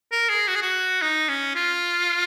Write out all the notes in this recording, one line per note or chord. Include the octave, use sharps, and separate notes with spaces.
A#4
G#4
F#4
G#4
F#4
D#4
C#4
F4